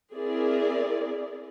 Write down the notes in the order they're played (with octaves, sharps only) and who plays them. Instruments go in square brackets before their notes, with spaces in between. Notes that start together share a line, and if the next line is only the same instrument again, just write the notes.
[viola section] C4 E4 G#4 A#4 D5